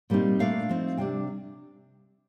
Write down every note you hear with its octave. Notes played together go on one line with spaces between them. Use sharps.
A#2 G3 C4 D#4
A#2 A3 D4 F5
F3 C4 D#4
C3 G3 D4 G5